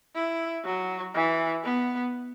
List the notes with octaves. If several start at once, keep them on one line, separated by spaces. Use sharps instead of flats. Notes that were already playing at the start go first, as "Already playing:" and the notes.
E4
F#3
E3
B3